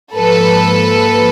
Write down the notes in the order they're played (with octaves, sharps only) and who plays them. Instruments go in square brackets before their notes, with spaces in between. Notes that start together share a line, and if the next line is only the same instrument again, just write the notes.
[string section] G#2 F3 A#3 A4 B4